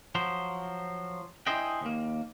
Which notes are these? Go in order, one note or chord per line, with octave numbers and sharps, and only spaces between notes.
F3 F#3 C5
D4 E4 G#4 C5 D#5 G5
D#2 A#3